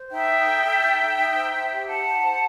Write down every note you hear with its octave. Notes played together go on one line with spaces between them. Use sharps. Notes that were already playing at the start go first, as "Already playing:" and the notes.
Already playing: C5
D#4 E5 G5
D#4
A4
A4
D#4
D#4
D#4
C5
C5 E5 G5
G4
D#4 F#5 A5
D#4
C5